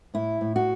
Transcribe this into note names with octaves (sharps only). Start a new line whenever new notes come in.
A2 E4
A2
F#4